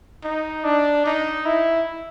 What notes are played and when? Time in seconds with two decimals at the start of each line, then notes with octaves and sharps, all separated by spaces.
0.24 D#4
0.64 D4
1.06 D#4
1.46 E4